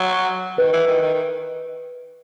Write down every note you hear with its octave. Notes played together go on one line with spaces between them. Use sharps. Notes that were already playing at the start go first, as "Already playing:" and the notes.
Already playing: F#3
D#3 B4
E3
D#3
D#3
D#3